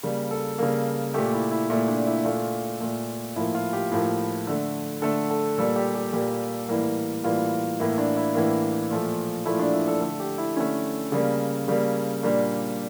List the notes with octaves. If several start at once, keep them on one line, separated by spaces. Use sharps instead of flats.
C#3 G3 A#3
A4
C#3 G3 A#3
A#2 A3 G4
E4
E4
A#2 A3 E4
D4
E4
A#2 A3 F4
A#2 A3
A2 F3 A#3 E4
F4
G4
A2 F3 A#3
D3 A3
D3 A3 A4
A4
A#2 G3 A#3 A4
G4
G4
A#2 G3 A#3 G4
A2 E3 G3 A#3
A2 E3 G3 A#3 F4
A2 E3 A#3 E4
D4
E4
A2 E3 A#3
A#2 F3 A3
A#2 F3 A3 E4
D4
E4
A4
D3 A3 A4
G4
E4
D3 A3 C#4
C#3 G3 A#3
C#3 G3 A#3
A#2 G3 A#3 D4